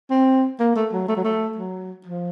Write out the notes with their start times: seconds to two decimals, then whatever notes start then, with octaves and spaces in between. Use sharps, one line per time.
0.10 C4
0.59 A#3
0.75 A3
0.92 F#3
1.08 A3
1.16 F#3
1.24 A3
1.57 F#3
2.06 F3